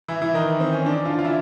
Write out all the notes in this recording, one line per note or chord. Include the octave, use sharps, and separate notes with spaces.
E3 E4
E3 E4
D#3 D#4
C4
C#4
D3 D4
F3 F4
F4
E3 E4